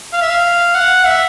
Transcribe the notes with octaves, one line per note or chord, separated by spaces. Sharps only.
F5
E5
F5
F#5
E5